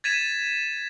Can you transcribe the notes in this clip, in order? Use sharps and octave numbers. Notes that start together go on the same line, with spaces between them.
G#6 A6 B6 D#7 E7